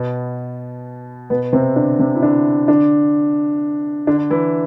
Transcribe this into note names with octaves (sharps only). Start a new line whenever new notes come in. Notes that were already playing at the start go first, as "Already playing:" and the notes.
Already playing: B2 B3
B2 B3
C3 C4
D3 D4
C3 C4
E4
D3 D4
D3 D4
D3 D4
E3 E4